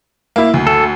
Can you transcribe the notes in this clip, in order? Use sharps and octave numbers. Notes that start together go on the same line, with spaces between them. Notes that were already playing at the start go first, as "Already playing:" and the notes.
A#3 E4
D2
A4